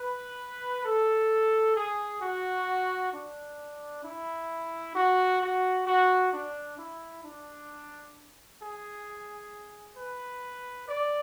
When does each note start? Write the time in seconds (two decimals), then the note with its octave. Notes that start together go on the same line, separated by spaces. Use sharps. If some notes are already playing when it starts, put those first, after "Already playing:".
Already playing: B4
0.85 A4
1.76 G#4
2.22 F#4
3.13 D4
4.04 E4
4.95 F#4
5.41 F#4
5.87 F#4
6.33 D4
6.78 E4
7.24 D4
8.60 G#4
9.97 B4
10.89 D5